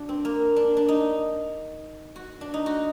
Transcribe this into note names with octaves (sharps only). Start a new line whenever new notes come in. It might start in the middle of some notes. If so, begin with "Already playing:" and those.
Already playing: D4 F#4
C4
A#3
D4
D4
D#4
F#4
D4
D#4
F#4